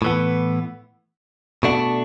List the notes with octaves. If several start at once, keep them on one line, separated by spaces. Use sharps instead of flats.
A2 E3 B3
B2 A3 D4 F#4